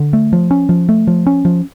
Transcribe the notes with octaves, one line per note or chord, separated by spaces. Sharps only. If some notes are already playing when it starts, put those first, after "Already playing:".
Already playing: D3
A3
F3
C#4
F3
A3
F3
C#4
F3